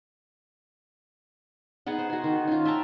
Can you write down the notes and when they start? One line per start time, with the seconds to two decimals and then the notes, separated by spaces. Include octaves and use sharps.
1.86 B3 D#4 G#4 F#5
1.98 C5
2.10 F#4 G#4
2.24 D#3
2.48 C#4 F4
2.65 E5 G5 A5 A#5